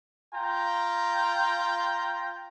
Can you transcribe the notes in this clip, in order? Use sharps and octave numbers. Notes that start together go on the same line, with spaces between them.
F4 G5 A#5